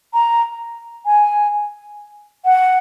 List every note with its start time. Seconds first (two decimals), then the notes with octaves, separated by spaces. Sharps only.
0.14 A#5
1.06 G#5
2.45 F#5